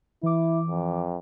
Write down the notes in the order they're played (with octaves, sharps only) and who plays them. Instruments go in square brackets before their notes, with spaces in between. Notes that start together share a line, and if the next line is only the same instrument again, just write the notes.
[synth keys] E3 D6 [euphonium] E4
[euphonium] F2